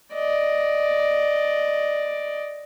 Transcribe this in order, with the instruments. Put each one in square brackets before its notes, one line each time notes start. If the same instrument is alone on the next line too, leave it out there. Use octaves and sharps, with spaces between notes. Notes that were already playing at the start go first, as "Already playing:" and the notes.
[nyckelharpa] D5 D#5